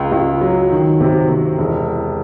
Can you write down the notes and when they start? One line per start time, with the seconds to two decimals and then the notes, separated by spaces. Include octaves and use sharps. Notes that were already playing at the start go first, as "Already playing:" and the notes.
Already playing: C#2
0.12 C#2
0.41 F#3
0.71 D#3
1.01 C3
1.29 C3
1.58 E1